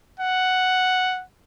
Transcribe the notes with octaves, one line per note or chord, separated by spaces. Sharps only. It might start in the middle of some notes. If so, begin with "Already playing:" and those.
F#5